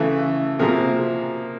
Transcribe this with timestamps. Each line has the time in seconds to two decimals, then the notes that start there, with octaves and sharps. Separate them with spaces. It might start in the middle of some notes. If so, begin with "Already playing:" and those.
Already playing: C#3 E3 A3
0.59 C3 F3 A#3 G#4 A#4